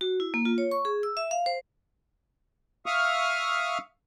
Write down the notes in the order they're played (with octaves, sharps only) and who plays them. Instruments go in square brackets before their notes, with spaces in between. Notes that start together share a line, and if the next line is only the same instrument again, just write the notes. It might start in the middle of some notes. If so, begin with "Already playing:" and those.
[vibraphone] F#4
E4
A#3
F4
C#5
C#6
G#4
E6
E5
F5
C5
[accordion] E5 F5 C#6 D#6 F6